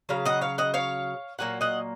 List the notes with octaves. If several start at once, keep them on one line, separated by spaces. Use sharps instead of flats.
C#3 F#3 F5
D#5 F#5
C#5 F5
D#5 F#5
C#5 F5
A#2 F#3 A#3 F#5
D#5 F#5